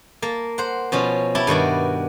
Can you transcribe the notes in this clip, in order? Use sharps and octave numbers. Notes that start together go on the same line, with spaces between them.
A#3 A5
C5 F#5
B2 F3 C#4 F4
E4 G4 G5 A5
G2 D#3 F#4 D5